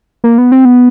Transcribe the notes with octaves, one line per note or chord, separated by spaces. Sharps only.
A#3
B3
C4
B3